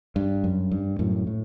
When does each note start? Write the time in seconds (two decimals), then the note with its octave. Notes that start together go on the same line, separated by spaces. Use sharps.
0.16 G2
0.44 F#2
0.71 G2
0.99 F#2 A2
1.27 A2